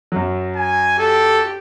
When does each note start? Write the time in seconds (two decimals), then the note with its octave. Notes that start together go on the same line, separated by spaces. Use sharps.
0.12 F#2 F#3
0.56 G#5
0.99 G4 A4